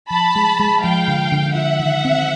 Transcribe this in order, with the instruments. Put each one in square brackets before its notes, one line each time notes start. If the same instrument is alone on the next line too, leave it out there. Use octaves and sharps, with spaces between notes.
[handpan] F3 [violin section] A5 B5
[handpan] G#3
G#3
[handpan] F3 [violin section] F5 G5
[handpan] D3
D3
[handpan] F4 [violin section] E5 F#5
[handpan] D#3
C4